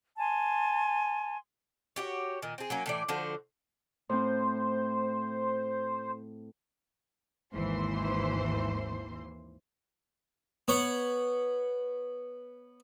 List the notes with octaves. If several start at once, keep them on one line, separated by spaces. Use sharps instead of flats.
G#5 A5 C6
F#4 G4 C#5
A#2 D#3
C4 G#4
F#3 A#3 C#4
A2 E3 D5
D3 F3 F#4 C5
A2 C4 C5
G#1 D#2 E3 C5 C6
B3 C#5 F#5